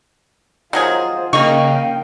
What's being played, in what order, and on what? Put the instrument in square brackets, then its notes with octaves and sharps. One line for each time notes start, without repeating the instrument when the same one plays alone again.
[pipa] D#3 F#3 G#4 [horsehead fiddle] F4 C5
[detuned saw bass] C#3 [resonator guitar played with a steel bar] A#3 D#4 [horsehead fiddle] F5 G5 [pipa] C#6